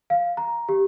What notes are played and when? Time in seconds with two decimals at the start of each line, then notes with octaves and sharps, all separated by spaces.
0.10 F5
0.37 A#5
0.69 G4